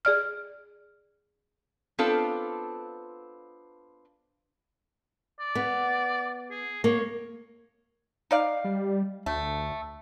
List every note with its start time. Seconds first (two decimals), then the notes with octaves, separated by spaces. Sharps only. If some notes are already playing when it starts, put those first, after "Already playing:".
0.05 G#4 D5 F6
1.99 B3 C4 D4 F4 A4 F5
5.40 D5
5.55 B3
6.51 G#4
6.84 A#3 C#5
8.31 D#4 D5 F5
8.64 G3
9.26 D2 A3